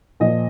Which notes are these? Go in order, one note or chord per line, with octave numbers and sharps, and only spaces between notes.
A#2 F3 D#5